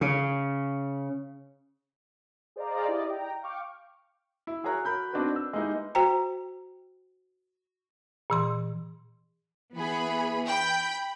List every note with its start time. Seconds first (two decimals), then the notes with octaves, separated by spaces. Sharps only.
0.01 C#3
2.56 G#4 C5 D5 D#5 F5 A#5
2.88 E4 G4 D5 D#5
3.10 G5 A#5
3.42 F5 G5 C#6 D6 F6
4.47 E4
4.64 F#4 G#4 A#4 C#5 A#5 F#6
4.85 F#4 A#4 B5 G6
5.13 B3 C4 D4 D#4 F#4 B4
5.36 E6
5.53 G#3 A#3 B3 D#4 E4 G4
5.95 F#4 C5 G5 A#5
8.30 A#2 E3 C6
9.75 E3 B3 G#4 B5
10.47 G5 B5 G6